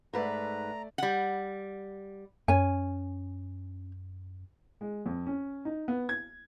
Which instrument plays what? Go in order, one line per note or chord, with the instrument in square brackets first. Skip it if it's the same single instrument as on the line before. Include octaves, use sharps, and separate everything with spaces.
[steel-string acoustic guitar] G#2 B4 [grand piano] A3 D5 E5 [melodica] A#5
[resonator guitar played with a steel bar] G3 F#5
[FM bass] F#2 [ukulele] C#4 G#5
[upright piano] G#3
F2
C#4
D#4
B3
G#6